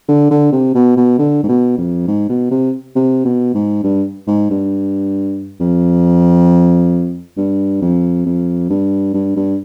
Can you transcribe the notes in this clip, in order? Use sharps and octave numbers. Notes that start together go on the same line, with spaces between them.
D3
D3
C3
B2
B2
D3
G#2
B2
F2
G#2
B2
C3
C3
B2
G#2
G2
G#2
G2
F2
G2
F2
F2
G2
G2
G2